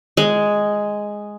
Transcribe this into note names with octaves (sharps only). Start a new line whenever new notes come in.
G#3